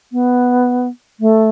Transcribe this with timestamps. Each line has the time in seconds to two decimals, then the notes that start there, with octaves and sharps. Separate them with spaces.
0.12 B3
1.20 A3